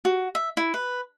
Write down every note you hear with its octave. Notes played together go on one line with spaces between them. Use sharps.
F#4
E5
E4
B4